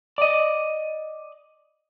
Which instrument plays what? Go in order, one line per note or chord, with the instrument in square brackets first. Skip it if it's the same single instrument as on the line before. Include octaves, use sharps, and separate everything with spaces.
[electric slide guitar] D5 D#5